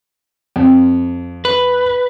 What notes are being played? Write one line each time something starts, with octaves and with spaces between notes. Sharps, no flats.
F2
B4